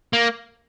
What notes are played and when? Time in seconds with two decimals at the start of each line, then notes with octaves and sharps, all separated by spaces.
0.13 A#3